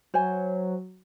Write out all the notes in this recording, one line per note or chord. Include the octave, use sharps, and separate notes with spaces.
F#3 C5 G#5